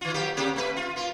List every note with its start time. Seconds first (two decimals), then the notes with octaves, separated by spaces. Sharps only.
0.01 D#3 F4
0.14 F#3 A#3 G4
0.37 C3 A#3 G4
0.56 A3 B4
0.76 F4
0.96 A#3 F4